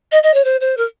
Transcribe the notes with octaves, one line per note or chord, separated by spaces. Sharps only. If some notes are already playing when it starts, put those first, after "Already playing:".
D#5
D#5
C#5
C5
C5
A#4